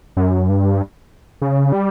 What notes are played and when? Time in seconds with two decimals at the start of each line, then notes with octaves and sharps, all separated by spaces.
0.17 F#2
0.49 G2
1.42 C#3
1.72 G3